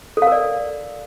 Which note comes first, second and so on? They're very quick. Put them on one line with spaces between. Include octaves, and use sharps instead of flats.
A4 F5 A#4 D5